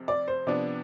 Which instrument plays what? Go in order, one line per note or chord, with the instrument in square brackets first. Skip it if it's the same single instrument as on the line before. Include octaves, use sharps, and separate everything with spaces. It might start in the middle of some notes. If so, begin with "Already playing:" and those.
Already playing: [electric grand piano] F2 C3
[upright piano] D5
C5
[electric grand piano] C3 F3 B3 D4 [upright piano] D5